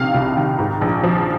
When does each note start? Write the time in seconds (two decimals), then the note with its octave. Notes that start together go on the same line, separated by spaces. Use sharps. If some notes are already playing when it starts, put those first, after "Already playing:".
Already playing: A#1 C3 D#3 F5
0.14 C2
0.37 D#3
0.59 G#2
0.81 A#1
1.03 F3